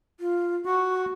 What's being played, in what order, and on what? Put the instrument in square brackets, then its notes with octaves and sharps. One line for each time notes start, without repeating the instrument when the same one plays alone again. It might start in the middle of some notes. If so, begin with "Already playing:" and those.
[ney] F4
[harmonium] F#4 [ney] C#6